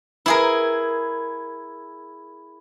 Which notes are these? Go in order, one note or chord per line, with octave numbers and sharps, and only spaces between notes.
E4 G#4 A#4